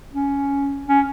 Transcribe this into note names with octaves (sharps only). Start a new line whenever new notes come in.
C#4
C#4